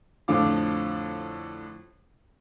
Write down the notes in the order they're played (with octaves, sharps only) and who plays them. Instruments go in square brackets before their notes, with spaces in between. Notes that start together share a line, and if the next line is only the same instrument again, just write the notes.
[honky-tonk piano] F2 A2 D3 F3 F5 D6